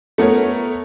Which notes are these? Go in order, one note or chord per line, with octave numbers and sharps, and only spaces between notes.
A3 B3 A#4 C#5